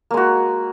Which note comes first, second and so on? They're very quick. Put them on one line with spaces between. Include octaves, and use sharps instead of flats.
A#3 G#3 F#4